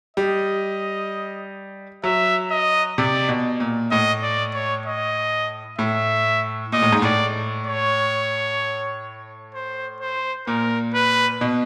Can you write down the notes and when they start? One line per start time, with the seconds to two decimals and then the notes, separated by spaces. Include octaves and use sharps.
0.16 G3 D#5
2.04 F#3 E5
2.51 D#5
2.98 C3 D5
3.29 B2
3.60 A#2
3.91 A2 D#5
4.23 D5
4.54 C#5
4.86 D#5
5.78 A2 E5
6.72 A#2 D#5
6.82 A2
6.92 G#2
7.02 A2 D5
7.67 C#5
9.54 C5
10.00 C5
10.47 A#2 A#4
10.94 B4
11.41 B2